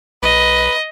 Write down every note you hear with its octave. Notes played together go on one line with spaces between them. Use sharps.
B1 B4 D#5